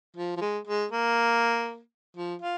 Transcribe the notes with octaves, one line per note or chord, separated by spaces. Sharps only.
F3
F3
G#3
G#3
A#3
F3
F4